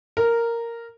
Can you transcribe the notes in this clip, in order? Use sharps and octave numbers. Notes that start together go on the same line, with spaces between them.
A#4